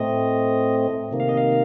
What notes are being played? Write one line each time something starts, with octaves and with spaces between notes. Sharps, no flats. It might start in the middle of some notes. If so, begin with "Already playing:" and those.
Already playing: A2 A3 C4 D#5
C3 D#3 A#3
F5
D#5
F5